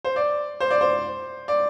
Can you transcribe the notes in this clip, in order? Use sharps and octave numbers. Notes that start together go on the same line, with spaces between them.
C5
D5
C5
D5
C5
D5